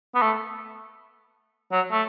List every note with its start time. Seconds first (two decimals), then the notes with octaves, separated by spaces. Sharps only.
0.15 B3
0.22 A3
1.72 F#3
1.91 A3